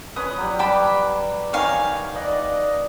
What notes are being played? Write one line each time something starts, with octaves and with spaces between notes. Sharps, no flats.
C#4 B4 D#6
F#3 G3
G5 A5 B5 D6
D#3 C#5 F5 G#5
D5 D#5 F#5